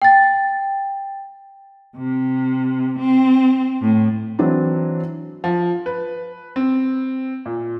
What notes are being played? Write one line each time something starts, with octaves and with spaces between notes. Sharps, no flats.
G5 A6
C3
C4
A2
E3 F#3 C4 D4
F3
B4
C4
A#2